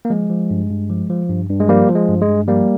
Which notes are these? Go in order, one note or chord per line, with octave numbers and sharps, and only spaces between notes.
A#3
F3 G#3
F3
G2
G2
F3
F3
G2
G2
G#3
F3 G3 A#3
F3
G#3
G2
G#3
G2
F3 G3 A#3